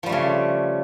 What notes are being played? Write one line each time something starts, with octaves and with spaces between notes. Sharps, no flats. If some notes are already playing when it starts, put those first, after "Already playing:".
C#3 F3 G3 A3